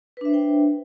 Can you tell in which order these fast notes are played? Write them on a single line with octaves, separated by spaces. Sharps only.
B4 D4 E5 C5 G5